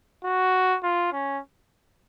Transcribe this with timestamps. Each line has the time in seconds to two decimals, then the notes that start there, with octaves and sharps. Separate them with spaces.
0.24 F#4
0.83 F4
1.12 C#4